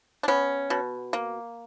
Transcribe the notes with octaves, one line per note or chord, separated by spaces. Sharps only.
D4
B3 C#4
B2
A#3